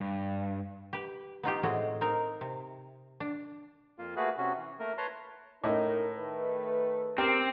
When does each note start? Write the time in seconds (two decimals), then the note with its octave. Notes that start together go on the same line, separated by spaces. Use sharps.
0.01 G2
0.93 G4 B4
1.43 B3 D#4 F4 G4
1.63 A2 G#3 C4 F#4 D#5
2.01 C4 D#4 A#4
2.41 C3
3.20 D4
3.98 F2 A#3 F4
4.16 A3 A#3 F#4 G#4 B4
4.38 C3 C#4 F#4
4.58 E3
4.79 A3 A#3 A#4
4.98 B4 C#5 A5 A#5 C6
5.64 A2 D#4 A#4 D#5
6.16 D#3 A3 B4
7.18 C4 G4 A#4